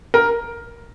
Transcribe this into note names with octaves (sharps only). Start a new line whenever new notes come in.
A#4